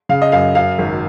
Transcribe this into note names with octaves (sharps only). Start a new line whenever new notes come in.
C#3 F5
D#5
F#2 F5
F#2 F5
G#1